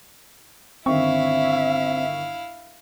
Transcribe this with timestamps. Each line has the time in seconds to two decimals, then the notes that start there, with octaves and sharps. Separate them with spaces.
0.86 G1 D#3 C4 E4 E5 F5 C#6